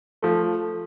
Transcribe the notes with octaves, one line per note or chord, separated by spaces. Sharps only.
F3 A3